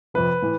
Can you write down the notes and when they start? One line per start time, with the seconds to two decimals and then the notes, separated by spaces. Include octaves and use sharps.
0.14 F2 C3 F3 B4
0.42 A2 E3